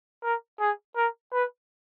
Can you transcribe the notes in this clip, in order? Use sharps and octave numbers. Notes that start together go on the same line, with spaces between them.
A#4
G#4
A#4
B4